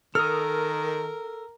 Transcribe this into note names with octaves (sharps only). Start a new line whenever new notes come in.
D#3 A4 A#4 D#6 F6